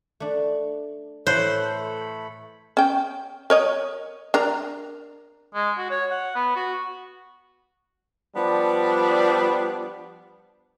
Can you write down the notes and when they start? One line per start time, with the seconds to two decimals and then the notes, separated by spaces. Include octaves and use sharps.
0.20 A3 D4
1.27 A2 E3 A3 A4 C5 C#5 B5 F#6
2.77 C#4 G5
3.50 A#4 C#5 D#5
4.34 D4 A#4 A#5
5.54 G#3
5.78 F#4
5.90 C#5
6.11 F#5
6.35 B3
6.56 F#4
8.36 F3 G3 B3 D4